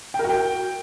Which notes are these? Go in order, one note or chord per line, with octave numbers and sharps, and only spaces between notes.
G5
A#4
F#4
G5